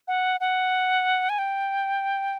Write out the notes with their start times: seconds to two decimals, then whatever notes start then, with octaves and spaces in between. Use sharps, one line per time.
0.08 F#5
0.40 F#5
1.29 G#5
1.39 G5